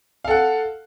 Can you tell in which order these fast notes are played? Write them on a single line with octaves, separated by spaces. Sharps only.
F5 A4 F#5